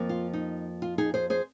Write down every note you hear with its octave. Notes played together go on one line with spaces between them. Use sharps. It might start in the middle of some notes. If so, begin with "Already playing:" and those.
Already playing: F2 F3 A#3
F4
D#4
F4
D#4 G#4
G#4 C5
G#4 C5